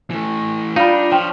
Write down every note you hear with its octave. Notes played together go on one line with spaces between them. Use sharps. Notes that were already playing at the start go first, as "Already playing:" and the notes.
E3 A3
G3 D4 D#4 F4 F5 B5
F3 D4 C#5 G5